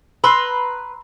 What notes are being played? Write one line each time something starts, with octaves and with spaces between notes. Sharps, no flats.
B4 A#5 C6 E6